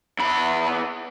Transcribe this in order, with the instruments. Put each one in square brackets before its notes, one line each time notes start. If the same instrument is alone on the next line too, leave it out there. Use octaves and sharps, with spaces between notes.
[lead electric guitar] E2 B5